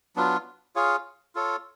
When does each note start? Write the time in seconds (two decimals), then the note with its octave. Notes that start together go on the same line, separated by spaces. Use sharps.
0.16 F#3 B3 D4 F4
0.76 F4 G#4 C#5 F5
1.35 F4 A4 C#5